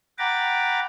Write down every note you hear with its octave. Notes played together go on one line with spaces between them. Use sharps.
F#5 G5 A#5 B5 D6 A6